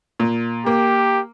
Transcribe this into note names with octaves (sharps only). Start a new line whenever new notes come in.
A#2
A#3 G4